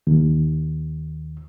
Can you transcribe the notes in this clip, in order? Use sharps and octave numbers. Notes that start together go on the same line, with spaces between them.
D#2